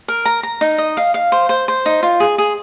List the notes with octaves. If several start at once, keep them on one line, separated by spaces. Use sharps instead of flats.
A#4
A#5
A#5
D#4
D#5
F5
F5
C5
C5
C5
D#4
F4
G#4
G#4